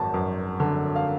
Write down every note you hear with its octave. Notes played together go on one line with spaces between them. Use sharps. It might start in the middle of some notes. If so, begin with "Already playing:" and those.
Already playing: G#1 F#2 A5
F#2
D3
F5